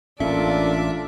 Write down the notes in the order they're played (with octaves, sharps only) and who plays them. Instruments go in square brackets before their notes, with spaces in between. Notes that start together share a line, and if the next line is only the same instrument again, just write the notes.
[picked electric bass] A1 C#4 [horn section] A#3 F4 A4 [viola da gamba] D4 D5 [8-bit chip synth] E5